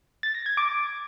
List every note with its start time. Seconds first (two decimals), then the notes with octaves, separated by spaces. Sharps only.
0.23 A6
0.35 A#6
0.46 G#6
0.57 D6